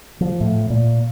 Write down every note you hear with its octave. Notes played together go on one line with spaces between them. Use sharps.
F3
A2
A#2